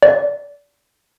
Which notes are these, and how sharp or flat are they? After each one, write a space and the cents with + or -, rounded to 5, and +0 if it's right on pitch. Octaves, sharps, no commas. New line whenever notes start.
D5 -25